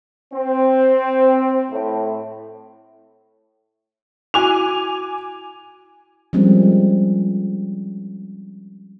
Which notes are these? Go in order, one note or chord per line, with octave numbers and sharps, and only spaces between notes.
C4
A2
E4 F#4 G#5 D6 F7
F3 G3 G#3 A#3 C4 C#4